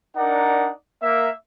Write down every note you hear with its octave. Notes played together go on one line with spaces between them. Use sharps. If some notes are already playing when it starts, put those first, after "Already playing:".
D4 D#4 A#4 D5 F#5
A#3 E5